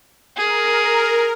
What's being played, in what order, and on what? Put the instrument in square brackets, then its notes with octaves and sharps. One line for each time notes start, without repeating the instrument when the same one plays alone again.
[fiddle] G#4 [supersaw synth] A#4